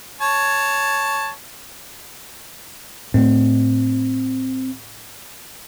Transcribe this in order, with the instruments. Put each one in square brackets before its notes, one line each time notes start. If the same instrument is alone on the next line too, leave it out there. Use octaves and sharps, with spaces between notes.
[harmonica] C#5 A5
[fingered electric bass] A2 A3 [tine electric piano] C4